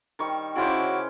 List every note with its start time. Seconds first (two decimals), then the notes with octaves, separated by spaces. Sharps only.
0.19 D#3 G3 C#6
0.56 C#3 C#4 E4 F#4 C5 D6